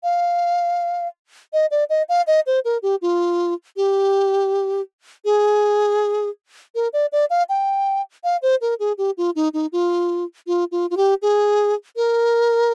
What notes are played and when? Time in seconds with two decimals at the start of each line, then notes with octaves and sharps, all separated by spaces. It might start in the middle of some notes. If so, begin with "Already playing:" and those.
0.03 F5
1.53 D#5
1.71 D5
1.89 D#5
2.09 F5
2.27 D#5
2.46 C5
2.65 A#4
2.82 G4
3.02 F4
3.76 G4
5.25 G#4
6.75 A#4
6.93 D5
7.12 D5
7.30 F5
7.49 G5
8.24 F5
8.42 C5
8.61 A#4
8.79 G#4
8.98 G4
9.17 F4
9.35 D#4
9.53 D#4
9.72 F4
10.47 F4
10.71 F4
10.90 F4
10.97 G4
11.22 G#4
11.96 A#4